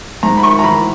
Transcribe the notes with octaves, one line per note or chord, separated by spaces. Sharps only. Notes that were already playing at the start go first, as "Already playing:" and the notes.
G#2 A#5
B5
C#6
A#5
E3 B5